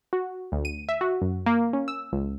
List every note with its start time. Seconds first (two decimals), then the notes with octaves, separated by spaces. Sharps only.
0.13 F#4
0.52 D2
0.65 D#7
0.89 E5
1.01 F#4
1.22 F#2
1.46 A#3
1.73 C#4
1.88 E6
2.12 C#2